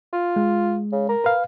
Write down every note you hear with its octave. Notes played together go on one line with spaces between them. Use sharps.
F4
G#3
C#3
A#4
B4 F5